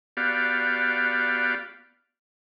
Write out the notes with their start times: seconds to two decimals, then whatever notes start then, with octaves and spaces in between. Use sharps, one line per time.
0.17 B3 F#4 G4 D5 F5